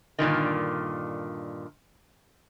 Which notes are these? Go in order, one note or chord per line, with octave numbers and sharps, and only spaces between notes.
G2 A#2 D3 D#3